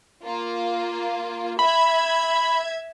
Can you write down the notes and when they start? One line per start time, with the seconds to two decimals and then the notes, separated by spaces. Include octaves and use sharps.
0.24 A#3 F4
1.59 E5 B5 G#6